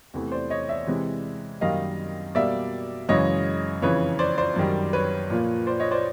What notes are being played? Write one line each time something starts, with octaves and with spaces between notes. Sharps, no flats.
E2 C3 E3 A3
C5 D5
C#5 D#5
D5 E5
C3 E3 G#3
F#2 D#3 G3 A#3 D#5 F5
B2 G3 A#3 D5 E5
F#2 C#3 E3 G#3 C#5 D#5
F2 C#3 E3 B4 C#5
C5 D5
C5 D5
F#2 D#3 G3
B4 C#5
A#2 F3 A#3
C5 D5
C#5 D#5
C5 D5